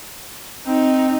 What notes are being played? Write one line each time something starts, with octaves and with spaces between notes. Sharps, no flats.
C4 D#4